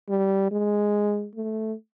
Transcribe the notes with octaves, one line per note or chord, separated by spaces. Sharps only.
G3
G#3
A3